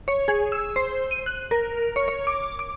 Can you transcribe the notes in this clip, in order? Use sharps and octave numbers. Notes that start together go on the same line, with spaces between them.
C#5
G#4
E6
C5
D#7
F#6
A#4
C#5
C#5
D6
D6